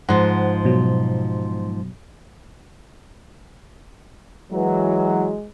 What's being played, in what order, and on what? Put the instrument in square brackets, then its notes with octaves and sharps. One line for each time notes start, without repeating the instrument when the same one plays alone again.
[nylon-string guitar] G#2 F3 [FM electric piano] F#5
[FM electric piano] B2 F#3
[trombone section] E3 F#3 [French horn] G#3